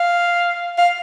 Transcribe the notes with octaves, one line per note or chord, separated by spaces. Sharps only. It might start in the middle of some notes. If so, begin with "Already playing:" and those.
Already playing: F5
F5